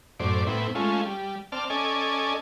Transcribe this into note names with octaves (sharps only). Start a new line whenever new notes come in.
F#2 A2 C5 D5
A2 B3 C4 E4
G#3 A3 C#4 F4
G3
C4 D5 A5 F6
C#4 A4 D5 D#5 G#5